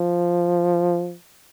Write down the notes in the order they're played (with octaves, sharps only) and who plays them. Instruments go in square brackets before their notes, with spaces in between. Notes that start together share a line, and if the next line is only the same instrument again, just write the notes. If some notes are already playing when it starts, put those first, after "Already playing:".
Already playing: [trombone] F3